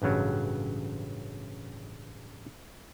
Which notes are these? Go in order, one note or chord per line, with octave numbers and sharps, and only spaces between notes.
A1 G2 C#3 F#3